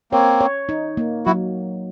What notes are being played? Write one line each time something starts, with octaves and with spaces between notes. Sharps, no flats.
A#3 C4 C#5
C#5
D#4
A#3
F#3 E4 F#4